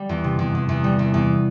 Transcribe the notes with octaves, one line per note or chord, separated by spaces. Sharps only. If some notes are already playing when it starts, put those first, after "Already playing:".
Already playing: G3
E2
C3
E2
E2
E2
G3
E2
E2